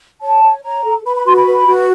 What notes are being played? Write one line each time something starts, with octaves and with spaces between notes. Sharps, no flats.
C#5 A5
C#5
C#5 A#5
A4
B4 B5
B5
F#4 C6
B5
B4
F#4